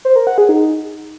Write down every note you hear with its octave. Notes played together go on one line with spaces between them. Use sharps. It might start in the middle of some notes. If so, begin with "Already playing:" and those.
C5
A#4
F#5
G#4
D#4